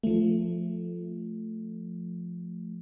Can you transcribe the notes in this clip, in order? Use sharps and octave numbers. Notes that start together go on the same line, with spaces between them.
F3 A3